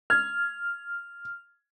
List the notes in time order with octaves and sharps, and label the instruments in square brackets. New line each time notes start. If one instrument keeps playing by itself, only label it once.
[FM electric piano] F6 [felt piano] G#6